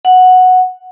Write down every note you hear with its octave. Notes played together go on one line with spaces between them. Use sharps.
F#5